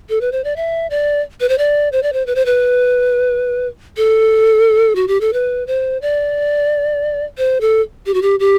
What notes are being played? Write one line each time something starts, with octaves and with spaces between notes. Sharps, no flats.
A4
B4
C5
D5
E5
D5
B4
C5
D5
C5
D5
C5
B4
C5
B4
A4
F#4
G4
A4
B4
C5
D5
C5
A4
G4
F#4
G4
G4